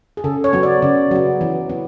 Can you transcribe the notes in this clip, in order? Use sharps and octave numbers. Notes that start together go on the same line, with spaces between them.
G#4
C#3 A4
C#5
F#3 B3
D5
C#3 D5
F#3 B3
E3
B3